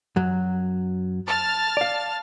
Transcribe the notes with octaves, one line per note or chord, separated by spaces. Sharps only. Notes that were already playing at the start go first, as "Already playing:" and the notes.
F#2 F#3
A5 F6 A6
D5 F5